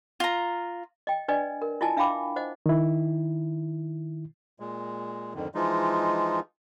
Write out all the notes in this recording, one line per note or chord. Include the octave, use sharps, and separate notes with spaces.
F4 A#5
D#5 G5
D4 B4 D5 D#5 G#5
A#4
E4 F4 D#5 G#5 A5
D4 E5 F5 G5 B5 D6
C5 D#5 F#5
D#3 E4
A#2 G#3
F2 G#2 D3 D#3
E3 F3 G#3 D#4 F4